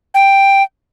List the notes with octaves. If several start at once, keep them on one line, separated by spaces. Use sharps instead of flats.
G5